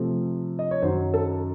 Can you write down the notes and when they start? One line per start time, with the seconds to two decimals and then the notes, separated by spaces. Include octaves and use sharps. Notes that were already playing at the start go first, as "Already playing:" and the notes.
Already playing: C3 F3 A3 C4
0.59 D#5
0.71 C#5
0.82 F#2 D#3 F#3 C5
1.14 A4